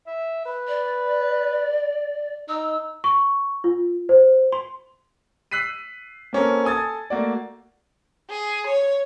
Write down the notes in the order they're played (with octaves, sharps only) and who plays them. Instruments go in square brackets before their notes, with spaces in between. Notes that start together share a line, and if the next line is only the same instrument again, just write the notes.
[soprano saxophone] E5
B4
[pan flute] D5
[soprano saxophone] D#4 [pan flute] E6
[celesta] C#6
F4
C5
C6
[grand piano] E6 F#6 B6 C7 D#7
A#3 C4 C#4 F#4 A4 A#4
A4 G#5 D#6 G#6 A6
A3 A#3 F#4 D5
[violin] G#4
C#5